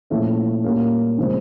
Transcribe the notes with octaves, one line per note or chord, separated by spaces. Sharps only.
A#2 F3 A3 C#4 E4
A#2 G3 A#3 C#4
C#3 F3 G#3 C4